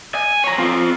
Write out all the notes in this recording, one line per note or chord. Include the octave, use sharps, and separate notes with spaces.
G#5
C#5 A#5
C4 F4